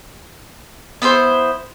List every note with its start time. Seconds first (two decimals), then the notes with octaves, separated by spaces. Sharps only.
1.02 B3 E4 A4 C5